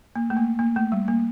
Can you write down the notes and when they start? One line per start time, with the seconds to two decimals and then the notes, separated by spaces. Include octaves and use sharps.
0.16 A#3
0.30 A3
0.37 A#3
0.59 A#3
0.76 A3
0.92 G3
1.08 A#3